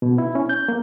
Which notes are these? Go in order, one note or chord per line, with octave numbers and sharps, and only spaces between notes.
B2
E4
C#4
G6
A#3